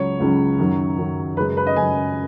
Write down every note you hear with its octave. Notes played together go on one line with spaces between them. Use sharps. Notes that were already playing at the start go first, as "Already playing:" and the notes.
Already playing: C#2 C#3 F#3 C#5
C#2 C#3 F#3
F#2 D#3 F#3
F#2 D#3 F#3
F#2 C#3 G#3 B4
B4
D#5
F#2 C#3 G#3 G#5